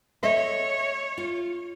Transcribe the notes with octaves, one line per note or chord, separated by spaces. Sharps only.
A4 C#5 D#5 E5
F4